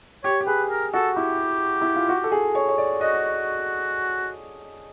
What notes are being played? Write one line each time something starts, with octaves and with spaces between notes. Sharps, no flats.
G4 C#5
G4
G#4 B4
A#4
F#4 A4
E4 G4
E4
F4
F#4
A4
G#4
C#5
C#5
D5
F#4 D#5